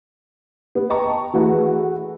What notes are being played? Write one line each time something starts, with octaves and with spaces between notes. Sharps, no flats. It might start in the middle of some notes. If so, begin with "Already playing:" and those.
B3
D#5 G5 A5 A#5 C#6
E3 A3 E4 F#4 G#4 B4